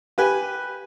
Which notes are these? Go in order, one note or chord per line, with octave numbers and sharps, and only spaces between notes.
G4 B4 G#5